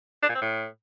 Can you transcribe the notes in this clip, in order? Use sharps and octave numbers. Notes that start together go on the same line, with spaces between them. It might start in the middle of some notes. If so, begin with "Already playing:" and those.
D4
A#2
C4
A2